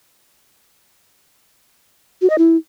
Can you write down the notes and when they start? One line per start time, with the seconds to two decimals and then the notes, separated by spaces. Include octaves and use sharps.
2.22 F#4
2.30 D#5
2.38 E4